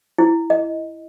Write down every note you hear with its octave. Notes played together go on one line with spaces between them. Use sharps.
E4
D#5